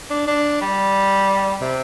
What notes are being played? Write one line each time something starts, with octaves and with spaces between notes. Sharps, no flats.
D4
D4
G3
C3